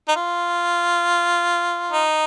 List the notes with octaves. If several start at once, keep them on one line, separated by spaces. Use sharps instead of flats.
D#4
F4
D#4